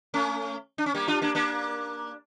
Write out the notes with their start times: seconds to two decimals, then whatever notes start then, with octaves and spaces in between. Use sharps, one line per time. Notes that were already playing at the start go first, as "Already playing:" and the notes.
0.14 A3 C#4
0.78 D4
0.86 C#4
0.94 G3 A#3
1.08 D4 F4
1.22 A#3 D4
1.35 A#3 D4